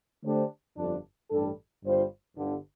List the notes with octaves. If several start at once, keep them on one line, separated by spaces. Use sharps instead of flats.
D3 A3 D4 G4 C5
G1 F2 D3 F3 D4
A1 G2 G3 D4 A4
G1 G2 G3 F4 C5
G1 G2 D3